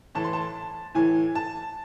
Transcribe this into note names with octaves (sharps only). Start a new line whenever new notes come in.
A2 E3 A5
C6
A5
A2 E3 G#5
A5